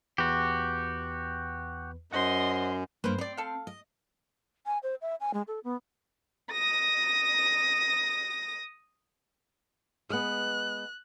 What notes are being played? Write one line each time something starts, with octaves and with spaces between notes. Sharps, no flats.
E2 F#4 G4 B4
F#2 C5 D#5 F#5 C6
G2 A#3 B4 C5
G3 C4 D5
A4 F5
D#5
G#5
C5
E5
G#5
G#3
A4
B3
D#6 A#6
G#3 B3 F#6